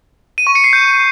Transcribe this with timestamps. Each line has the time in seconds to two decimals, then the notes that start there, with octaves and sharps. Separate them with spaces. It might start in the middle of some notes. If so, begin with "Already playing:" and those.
0.38 D#7
0.47 C#6
0.55 C#7
0.64 C7
0.73 G6